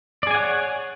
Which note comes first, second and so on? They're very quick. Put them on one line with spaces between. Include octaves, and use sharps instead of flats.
D5 G#4 G#5 F#5 C#5